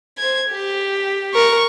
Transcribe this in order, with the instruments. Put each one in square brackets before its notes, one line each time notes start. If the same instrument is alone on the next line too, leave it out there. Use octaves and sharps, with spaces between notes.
[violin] C5 G#6
G4
[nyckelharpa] A#4 [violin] C#6